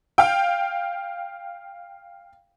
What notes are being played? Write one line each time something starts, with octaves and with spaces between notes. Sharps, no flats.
F5 G5